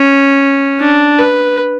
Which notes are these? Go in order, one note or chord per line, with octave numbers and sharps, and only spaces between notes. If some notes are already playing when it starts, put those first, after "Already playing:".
Already playing: C#4
D4
B4